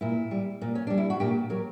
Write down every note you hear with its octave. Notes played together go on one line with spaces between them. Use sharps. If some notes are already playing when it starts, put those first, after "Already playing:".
A#2 E4
G3
A#2
C#4
G3 D4
E4
F#4
A#2 G4
F#3 A#4